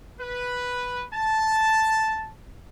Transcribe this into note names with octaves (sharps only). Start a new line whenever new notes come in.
B4
A5